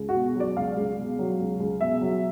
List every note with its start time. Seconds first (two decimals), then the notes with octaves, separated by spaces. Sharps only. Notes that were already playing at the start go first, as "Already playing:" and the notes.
Already playing: C#2
0.09 F#4
0.15 B2
0.35 F#3 D5
0.56 C#2 F5
0.77 C#2
0.98 B2
1.19 F#3
1.39 C#2
1.60 C#2
1.81 B2 E5
2.01 F#3